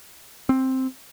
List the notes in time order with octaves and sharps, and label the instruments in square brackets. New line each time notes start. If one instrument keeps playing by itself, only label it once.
[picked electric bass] C4